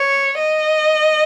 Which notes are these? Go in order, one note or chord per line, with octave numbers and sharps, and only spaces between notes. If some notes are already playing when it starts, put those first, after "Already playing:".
Already playing: C#5
D#5